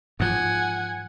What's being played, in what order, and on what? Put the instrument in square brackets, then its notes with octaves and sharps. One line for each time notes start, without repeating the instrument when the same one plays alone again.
[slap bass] G#2 F3 [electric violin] F#5 G#5